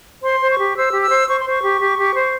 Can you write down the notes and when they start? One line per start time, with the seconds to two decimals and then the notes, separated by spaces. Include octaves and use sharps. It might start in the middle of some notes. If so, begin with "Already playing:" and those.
0.22 C5 C6
0.40 C5
0.49 C#6
0.57 G4
0.75 C5 E6
0.93 G4
1.01 E6
1.09 C5
1.28 C5 C#6
1.38 C6
1.45 C5 C#6
1.62 G4
1.80 G4
1.97 G4
2.14 C5